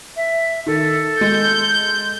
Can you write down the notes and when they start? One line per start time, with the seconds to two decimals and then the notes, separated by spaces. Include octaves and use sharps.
0.16 E5
0.66 D#3 A4
1.21 G#3 G6